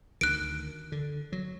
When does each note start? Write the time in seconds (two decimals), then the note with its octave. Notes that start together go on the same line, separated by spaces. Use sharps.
0.21 D2 D#3 F#6 D7
0.92 D3
1.32 F#3